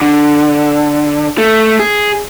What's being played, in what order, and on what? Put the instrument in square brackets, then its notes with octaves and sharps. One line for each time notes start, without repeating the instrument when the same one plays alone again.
[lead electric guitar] D3
A3
G#4